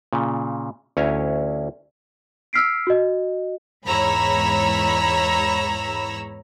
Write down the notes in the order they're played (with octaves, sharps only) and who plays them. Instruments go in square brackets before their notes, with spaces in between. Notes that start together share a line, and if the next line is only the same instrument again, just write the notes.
[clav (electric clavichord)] A#2 C#3
D2 C#4 E4 C#5 G#5 A#5
[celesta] E6 F6 B6 C7 D7
F#4 D#5
[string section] E2 G#2 C#5 A#5 B5 E6